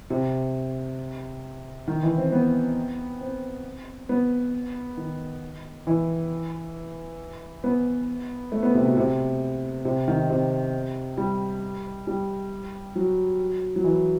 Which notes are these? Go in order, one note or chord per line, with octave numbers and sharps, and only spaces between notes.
C3
D#3
E3
C4
B3
C4
B3
D#3
E3
B3
A3
B3
C3
B2
C3
C3
D#3
C3
G3
G3
F#3
F#3
E3